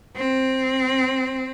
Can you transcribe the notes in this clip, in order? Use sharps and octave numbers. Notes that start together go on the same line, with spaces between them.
C4